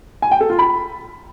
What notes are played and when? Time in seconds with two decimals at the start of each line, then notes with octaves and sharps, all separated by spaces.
0.22 G#5
0.31 G5
0.41 A4
0.50 F4
0.59 B5